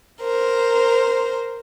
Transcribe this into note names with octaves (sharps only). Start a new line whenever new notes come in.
A#4 C5